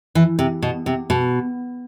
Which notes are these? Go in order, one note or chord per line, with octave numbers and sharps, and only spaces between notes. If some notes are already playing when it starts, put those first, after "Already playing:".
E3
C3
B2
C3
B2